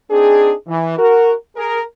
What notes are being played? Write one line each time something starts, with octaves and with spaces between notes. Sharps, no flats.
C4 D4 D#4 G#4
E3
F#4 A#4
G#4 A#4